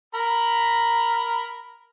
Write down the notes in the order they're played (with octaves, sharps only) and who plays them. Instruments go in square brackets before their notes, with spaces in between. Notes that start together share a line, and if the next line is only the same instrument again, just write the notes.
[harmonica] A#4 A#5 B5